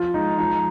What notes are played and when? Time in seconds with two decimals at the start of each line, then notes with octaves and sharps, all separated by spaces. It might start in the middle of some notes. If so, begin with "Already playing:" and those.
Already playing: F3 F4
0.14 G#3 D#4
0.38 F3 D#4